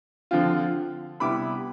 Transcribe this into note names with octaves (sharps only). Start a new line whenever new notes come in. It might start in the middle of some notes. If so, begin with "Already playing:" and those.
D3 F3 C4 F4
C3 G3 B3 E4 B5 D6